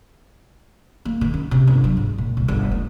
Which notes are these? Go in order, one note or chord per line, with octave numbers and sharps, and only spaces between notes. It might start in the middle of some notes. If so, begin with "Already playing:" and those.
A#3
D#3
C#4
C3
G1
F#3
G#2
A#2
C2
G1
A3